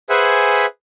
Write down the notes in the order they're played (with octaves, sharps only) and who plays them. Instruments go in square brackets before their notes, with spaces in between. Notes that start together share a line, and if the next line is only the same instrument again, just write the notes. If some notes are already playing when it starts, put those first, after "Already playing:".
[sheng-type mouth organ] G#4 B4 C5 E5 F#5 G#5